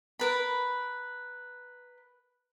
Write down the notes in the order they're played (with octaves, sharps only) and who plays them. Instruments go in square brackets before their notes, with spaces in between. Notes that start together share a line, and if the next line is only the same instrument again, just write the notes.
[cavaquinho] A#4 B4 B5